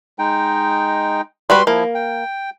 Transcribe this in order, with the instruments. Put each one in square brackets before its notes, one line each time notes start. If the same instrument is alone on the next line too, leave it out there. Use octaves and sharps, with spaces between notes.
[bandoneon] G#3 D#4 G5
[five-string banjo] G3 F#4 B4 [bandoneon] C6
[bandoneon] F3 E4 [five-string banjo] A#3
[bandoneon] G5